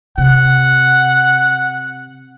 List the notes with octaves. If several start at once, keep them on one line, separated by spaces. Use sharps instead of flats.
C3 F#5